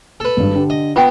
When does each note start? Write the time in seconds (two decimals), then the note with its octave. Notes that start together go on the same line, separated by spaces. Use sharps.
0.20 A4 B4
0.37 G#1 G2
0.55 D3 G4
0.70 D#5
0.96 B3 F4 G5